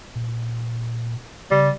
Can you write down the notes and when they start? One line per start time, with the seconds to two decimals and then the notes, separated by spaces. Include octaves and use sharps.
0.15 A#2
1.51 C#3 G3